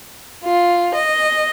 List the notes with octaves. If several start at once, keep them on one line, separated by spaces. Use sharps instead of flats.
F4
D#5